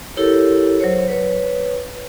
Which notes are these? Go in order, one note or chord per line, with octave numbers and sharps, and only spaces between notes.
E4 G4 A4 A#4 C#5
F#3 C5 C#5
B4 C#5